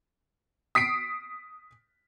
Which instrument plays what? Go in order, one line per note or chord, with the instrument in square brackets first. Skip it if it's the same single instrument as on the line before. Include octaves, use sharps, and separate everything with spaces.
[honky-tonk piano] D#6 B6 C7 D7